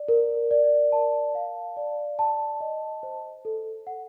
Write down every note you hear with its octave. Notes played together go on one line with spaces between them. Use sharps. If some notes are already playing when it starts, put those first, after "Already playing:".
Already playing: D5
A#4
D5
A5
F5
D5
A5
D#5
C5
A4
F#5